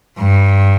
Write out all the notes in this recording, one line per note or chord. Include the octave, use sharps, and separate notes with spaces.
G2